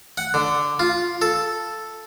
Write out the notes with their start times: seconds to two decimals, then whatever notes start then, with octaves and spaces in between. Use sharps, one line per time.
0.18 F#5
0.34 D3
0.79 F4
1.22 A4